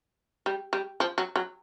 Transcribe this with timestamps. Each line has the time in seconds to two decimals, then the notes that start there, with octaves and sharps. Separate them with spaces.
0.46 G3
0.73 G3
1.00 F3
1.18 F#3
1.36 F#3